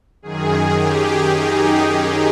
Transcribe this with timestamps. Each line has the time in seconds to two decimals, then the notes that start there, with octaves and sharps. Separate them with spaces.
0.22 F#2 D#3 G#4
0.78 G4
1.32 D#4